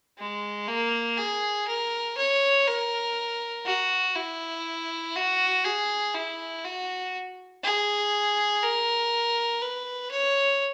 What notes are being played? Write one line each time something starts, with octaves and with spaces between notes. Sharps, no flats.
G#3
A#3
G#4
A#4
C#5
A#4
F#4
E4
F#4
G#4
E4
F#4
G#4
A#4
B4
C#5